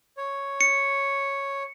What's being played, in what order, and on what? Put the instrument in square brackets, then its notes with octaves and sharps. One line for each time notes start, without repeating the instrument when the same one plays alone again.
[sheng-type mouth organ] C#5
[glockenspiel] C#7